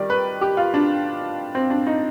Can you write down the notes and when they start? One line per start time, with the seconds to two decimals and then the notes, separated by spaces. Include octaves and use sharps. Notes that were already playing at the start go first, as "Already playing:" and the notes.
Already playing: D#3 G3 D5
0.10 B4
0.41 G4
0.57 F4
0.74 D4
1.55 C4
1.70 D4
1.87 D#4